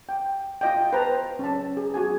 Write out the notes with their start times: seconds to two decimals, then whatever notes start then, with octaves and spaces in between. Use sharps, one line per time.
0.09 G5
0.61 F4 D#5 G5
0.93 B4 C5 G5 A5 A#5
1.39 C#4 A5
1.77 G#4
1.94 F#4 G#4 G#5